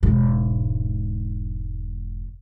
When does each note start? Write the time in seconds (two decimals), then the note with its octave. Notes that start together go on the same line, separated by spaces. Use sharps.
0.03 E1 G#2